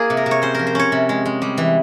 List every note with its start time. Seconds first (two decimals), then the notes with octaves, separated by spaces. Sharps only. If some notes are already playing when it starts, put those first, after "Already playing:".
Already playing: A#3 F4 G#4
0.10 C3
0.17 A#4
0.26 C3
0.31 C#5
0.42 C#4 C5
0.55 F3 A#4
0.67 C5
0.75 C#4 C#5
0.92 C3
1.09 G#3
1.26 G#3
1.42 G3
1.58 E3